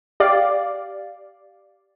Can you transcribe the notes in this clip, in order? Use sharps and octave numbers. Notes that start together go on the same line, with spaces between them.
G4 D5 F5